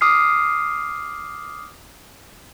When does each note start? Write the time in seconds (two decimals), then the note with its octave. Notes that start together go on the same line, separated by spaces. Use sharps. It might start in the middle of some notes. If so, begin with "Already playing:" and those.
0.01 D6 D#6 F6 C7